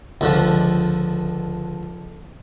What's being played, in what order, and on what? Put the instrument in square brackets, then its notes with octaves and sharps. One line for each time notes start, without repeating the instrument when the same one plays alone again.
[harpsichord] C#2 D3 F3